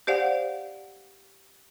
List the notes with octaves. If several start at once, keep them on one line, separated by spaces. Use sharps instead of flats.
G4 C5 D5 F5 F#5